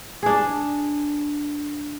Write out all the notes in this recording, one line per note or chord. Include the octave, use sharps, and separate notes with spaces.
D4 G#4